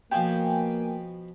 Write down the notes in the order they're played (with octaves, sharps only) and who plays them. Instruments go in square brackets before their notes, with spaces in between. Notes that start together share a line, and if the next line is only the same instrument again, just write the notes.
[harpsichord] B2 F3 [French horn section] A#3 [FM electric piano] G5 G#5